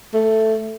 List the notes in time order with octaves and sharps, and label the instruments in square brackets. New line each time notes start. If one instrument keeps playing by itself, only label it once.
[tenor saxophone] A3